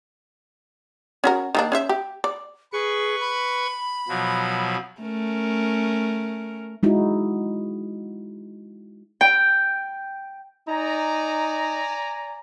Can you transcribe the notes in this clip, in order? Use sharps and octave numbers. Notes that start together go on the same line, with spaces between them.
C#4 F#4 A#4
D#3 A#3 D4
C#4 C5 E5
G4
D5
G#4 B4 C#6
B5
B2 F3 F#3
A3 C#4 A#4
G#3 D#4 E4 F#4
G5
D#4 D5 G#5 A#5